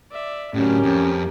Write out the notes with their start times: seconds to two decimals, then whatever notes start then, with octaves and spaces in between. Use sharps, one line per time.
0.10 D5 E5
0.54 A2 F#3 C#4 G4 A#4
0.83 F2